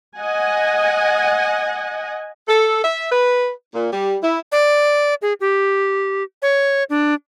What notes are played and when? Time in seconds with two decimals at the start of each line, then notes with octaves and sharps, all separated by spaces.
0.18 D#5 F#5 G#5
2.48 A4
2.84 E5
3.12 B4
3.74 A#2
3.93 G3
4.23 E4
4.52 D5
5.22 G#4
5.41 G4
6.42 C#5
6.90 D4